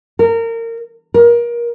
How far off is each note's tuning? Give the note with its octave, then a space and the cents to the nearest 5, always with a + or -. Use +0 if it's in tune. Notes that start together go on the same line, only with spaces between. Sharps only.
A#4 -25
A#4 +25